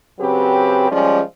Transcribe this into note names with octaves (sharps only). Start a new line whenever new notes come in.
C#3 F#3 C4 G4 B4
F3 G3 G#3 C#4 D5